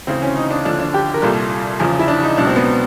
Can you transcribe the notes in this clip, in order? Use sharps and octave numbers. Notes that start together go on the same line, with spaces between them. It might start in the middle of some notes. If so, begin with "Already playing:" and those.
D2 C#3 E3 C4
C#4
D#4
D4
D#2 D3 F3 D4
D4
G4
A#4
C2 A#2 G3 A4
E2 C#3 F3 G#4
E4
D4
D#4
C#2 B2 F#3 D4
C4
B3